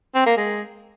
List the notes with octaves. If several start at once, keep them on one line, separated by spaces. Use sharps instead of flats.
C4
A#3
G#3